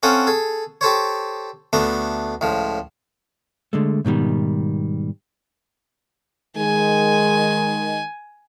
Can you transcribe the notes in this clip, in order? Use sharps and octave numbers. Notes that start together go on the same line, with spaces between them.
C4 C#4 A4 F5 F#5 D#6
G#4 A4
G4 A4 C5 C#5
D2 A3 B3 D4 A#5
C#2 A2 F3
D3 G#3 A3
G#2 B2 D#3 G3
D#3 G#3 G#5